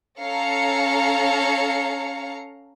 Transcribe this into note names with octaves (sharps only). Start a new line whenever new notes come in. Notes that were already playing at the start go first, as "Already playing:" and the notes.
C#4 A4 F5 A#5 C#7